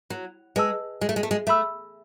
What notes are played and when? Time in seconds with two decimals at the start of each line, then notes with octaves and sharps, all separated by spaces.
0.10 F#3
0.56 G#3 B4 D#5 A5 E6
1.01 G#3
1.09 A3
1.16 G#3
1.23 A3
1.31 G#3
1.47 A3 E5 B5 E6